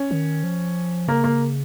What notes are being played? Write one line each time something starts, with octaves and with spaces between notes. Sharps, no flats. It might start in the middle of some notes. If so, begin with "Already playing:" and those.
Already playing: C#4
D#3
F3
C#3 A#3
A#3